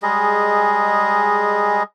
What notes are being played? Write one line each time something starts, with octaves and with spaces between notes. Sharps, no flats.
G3 G#3 G#4 D#5